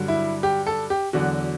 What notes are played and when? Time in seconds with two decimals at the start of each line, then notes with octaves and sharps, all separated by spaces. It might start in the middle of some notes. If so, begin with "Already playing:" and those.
Already playing: G2 D3 F#3
0.08 E4
0.43 G4
0.67 A4
0.90 G4
1.13 E2 D3 F#3 F#4